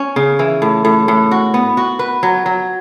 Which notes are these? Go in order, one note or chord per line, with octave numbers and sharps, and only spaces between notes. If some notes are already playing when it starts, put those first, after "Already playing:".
Already playing: C#4
C#3
E3
A2
A2
A2
F#4
B3
F#4
B4
F#3
F#3